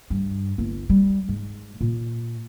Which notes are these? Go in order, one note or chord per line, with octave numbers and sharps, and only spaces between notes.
G2
G1
G3
G#2
A#2